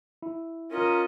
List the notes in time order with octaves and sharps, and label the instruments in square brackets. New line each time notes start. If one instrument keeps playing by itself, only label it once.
[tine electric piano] E4
[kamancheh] C#4 D#5 [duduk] F4 [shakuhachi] A#4